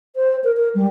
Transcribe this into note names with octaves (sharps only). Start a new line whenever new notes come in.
C5
A#4
A#4
G3